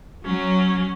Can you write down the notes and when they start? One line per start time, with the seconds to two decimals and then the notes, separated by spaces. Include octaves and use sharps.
0.25 F#3 C#4